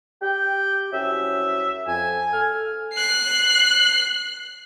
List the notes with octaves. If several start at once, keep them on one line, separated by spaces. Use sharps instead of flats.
G4 G5
C2 F#3 C#4 E5
F2 G#5
A4 F6
F#6 C7